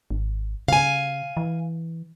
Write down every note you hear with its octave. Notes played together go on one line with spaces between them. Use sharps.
G#1
C#3 F5 G#5
E3